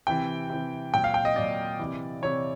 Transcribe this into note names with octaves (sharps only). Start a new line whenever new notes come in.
C3 E3 G5
C3 E3
A#2 F#3 G5
F5
G5
D#5
A#2 F#3 D5
C3 E3
C3 E3 C#5